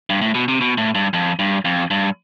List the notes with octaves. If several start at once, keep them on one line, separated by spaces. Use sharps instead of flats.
G2
A2
B2
C3
B2
A2
G2
F2
G2
F2
G2